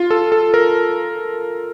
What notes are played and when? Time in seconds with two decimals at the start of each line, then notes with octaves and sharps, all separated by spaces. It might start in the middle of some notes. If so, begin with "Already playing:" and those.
Already playing: F4
0.11 A4
0.32 A4
0.54 A#4